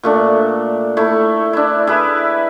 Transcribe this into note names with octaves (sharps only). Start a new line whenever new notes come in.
A#2 A3 D4
A3 E4
D4 E4
E4 G#4 B4